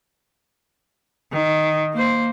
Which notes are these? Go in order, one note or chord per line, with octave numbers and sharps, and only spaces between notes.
D#3
A#3 C5